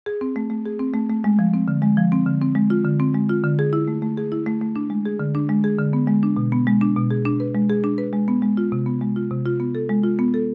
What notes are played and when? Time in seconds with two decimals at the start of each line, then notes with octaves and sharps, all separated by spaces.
0.06 G#4
0.21 C4
0.36 A3
0.50 A3
0.66 G#4
0.79 C4
0.94 A3
1.10 A3
1.24 G#3
1.39 F3
1.54 C4
1.68 D3
1.82 G#3
1.97 F3
2.12 C4
2.26 D3
2.42 C4
2.55 G#3
2.70 F4
2.85 D3
3.00 C4
3.14 G#3
3.29 F4
3.44 D3
3.59 G#4
3.73 E4
3.88 A3
4.02 A3
4.17 G#4
4.32 E4
4.46 A3
4.61 A3
4.76 D4
4.90 G#3
5.05 G#4
5.19 D3
5.35 D4
5.49 G#3
5.64 G#4
5.79 D3
5.93 B3
6.07 G#3
6.23 D4
6.37 B2
6.52 B3
6.67 G#3
6.81 D4
6.96 B2
7.11 G#4
7.25 D4
7.40 B4
7.55 G#3
7.70 G#4
7.84 D4
7.98 B4
8.13 G#3
8.28 B3
8.42 G#3
8.57 F4
8.72 C3
8.86 B3
9.01 G#3
9.16 F4
9.31 C3
9.46 F4
9.60 B3
9.75 A4
9.89 G#3
10.04 F4
10.19 B3
10.34 A4